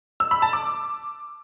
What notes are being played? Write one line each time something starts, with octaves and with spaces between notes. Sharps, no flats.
E6
B5
A5
D6